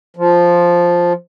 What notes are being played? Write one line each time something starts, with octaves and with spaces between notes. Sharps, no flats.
F3